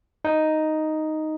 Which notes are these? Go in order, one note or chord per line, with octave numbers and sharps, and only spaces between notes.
D#4